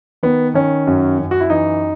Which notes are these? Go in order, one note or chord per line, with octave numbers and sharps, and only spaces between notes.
D#3 B3
D#3 C#4
F#2
F#2
F#4
E4
E3 D#4